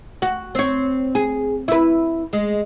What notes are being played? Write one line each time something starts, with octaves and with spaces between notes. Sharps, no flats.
F#4
C4 C#5
G#4
E4 B4
G#3